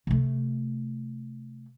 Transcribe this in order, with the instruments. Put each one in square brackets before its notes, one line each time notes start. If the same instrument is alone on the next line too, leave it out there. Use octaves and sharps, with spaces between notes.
[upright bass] C3 A3